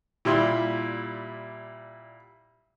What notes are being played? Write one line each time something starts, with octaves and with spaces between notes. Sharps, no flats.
A#2 G3 E4 C6